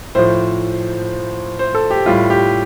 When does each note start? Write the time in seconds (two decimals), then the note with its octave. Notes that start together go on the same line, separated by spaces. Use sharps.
0.15 A2 F3 C5
1.59 C5
1.74 A4
1.91 G4
2.06 A2 G3 F4
2.30 G4